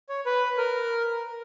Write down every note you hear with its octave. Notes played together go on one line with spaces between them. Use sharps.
C#5
B4
A#4